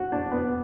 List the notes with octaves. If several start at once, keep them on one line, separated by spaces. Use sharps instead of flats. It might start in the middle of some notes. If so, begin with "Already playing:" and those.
Already playing: F#4
D4
B3